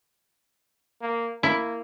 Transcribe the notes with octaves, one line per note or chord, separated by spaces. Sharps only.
A#3
A#3 E4